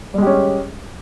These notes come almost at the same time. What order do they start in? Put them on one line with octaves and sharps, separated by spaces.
G3 G#3 G4 C#4